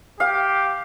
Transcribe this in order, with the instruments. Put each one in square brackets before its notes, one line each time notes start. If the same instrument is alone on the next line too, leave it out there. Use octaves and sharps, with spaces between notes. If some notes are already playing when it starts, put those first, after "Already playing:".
[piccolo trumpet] G4 [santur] F5